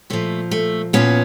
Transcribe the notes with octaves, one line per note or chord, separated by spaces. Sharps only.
A#2 F3 A3
A3
A#2 F3 B3 C#4